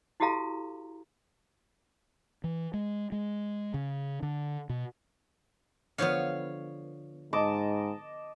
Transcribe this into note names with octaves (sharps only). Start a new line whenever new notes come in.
E4 F#4 G4 A4 F5 A#5
E3
G#3
G#3
C#3
D3
B2
D3 F3 B3 C#5 F5
G#2 D#5 A5 D6